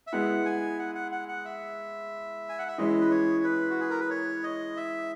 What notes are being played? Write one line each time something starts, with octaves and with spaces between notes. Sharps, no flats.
E5
G#3 B3 E4 F#5
G#5
F#5
F#5
F#5
F#5
E5
G#5
F#5
E5
E3 G#3 C#4 E4 D#5
B4
C#5
B4
F#4
G#4
A#4
B4
C#5
D#5
E5